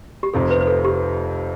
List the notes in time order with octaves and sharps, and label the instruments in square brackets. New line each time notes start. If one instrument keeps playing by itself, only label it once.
[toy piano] G4
[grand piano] F1 F2 C3 F3 C4 [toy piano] A4
[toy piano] B4
B4
A4
G4